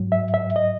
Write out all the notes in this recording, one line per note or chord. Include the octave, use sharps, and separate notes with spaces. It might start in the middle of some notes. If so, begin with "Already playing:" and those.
Already playing: G#2 F#3
E5
E5
D#5